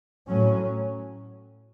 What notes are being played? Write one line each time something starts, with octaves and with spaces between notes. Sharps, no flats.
A2 F#3 C#4